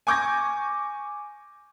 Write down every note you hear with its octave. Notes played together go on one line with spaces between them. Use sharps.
G#5 C#6 D6 G6 G#6 A#6